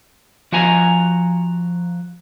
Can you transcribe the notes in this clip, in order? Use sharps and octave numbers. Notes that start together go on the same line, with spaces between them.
F3 F#4 F#5 G#5 A#5